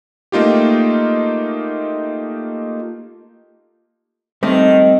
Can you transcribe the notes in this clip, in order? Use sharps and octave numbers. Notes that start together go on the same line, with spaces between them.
A3 A#3 D#4 F4 G4
D#3 G3 A3 C4